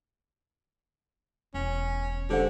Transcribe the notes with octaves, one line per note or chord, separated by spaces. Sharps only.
E1 C#4
D3 G4 C5 F#5